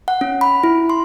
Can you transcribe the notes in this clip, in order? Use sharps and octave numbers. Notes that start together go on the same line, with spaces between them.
F#5
C#4
B5
E4
C6